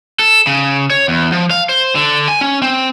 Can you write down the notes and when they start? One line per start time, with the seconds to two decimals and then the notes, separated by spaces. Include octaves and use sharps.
0.19 A4
0.47 C#3
0.90 C#5
1.08 E2
1.32 F3
1.50 F5
1.69 C5
1.95 D3
2.28 G#5
2.41 C#4
2.62 C4